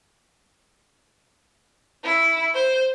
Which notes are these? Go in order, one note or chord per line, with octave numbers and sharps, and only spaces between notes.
E4
C5